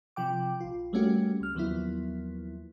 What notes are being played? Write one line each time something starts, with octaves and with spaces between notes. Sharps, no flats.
C3 F3 G5 D6
A#1 F4
G3 A3 A#3 C#4 F#4 G4
C#2 F6
D#2 F3 F#3 A#3 B3 E4